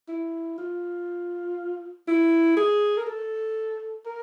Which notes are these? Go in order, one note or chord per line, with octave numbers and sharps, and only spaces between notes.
E4
F4
E4
G#4
A#4
A4
A#4